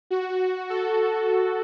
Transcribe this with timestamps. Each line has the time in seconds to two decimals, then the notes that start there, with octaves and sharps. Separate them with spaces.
0.10 F#4
0.70 A4